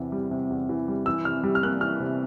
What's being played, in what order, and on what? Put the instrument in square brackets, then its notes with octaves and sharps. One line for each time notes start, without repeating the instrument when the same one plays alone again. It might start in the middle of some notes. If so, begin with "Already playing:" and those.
Already playing: [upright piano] E2 C3 E3
G3
C3
E2
E3
G3
E3 E6
C3 F6
G3
F6
A#3 F#6
E3 F6
C3